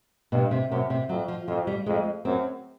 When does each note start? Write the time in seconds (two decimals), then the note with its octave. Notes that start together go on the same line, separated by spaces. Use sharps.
0.32 G2 B2
0.51 C3
0.71 F#2 C3
0.90 C3
1.09 F2 F#3
1.28 F3
1.48 F2 F3
1.67 G3
1.86 F2 G#3
2.25 F#2 C4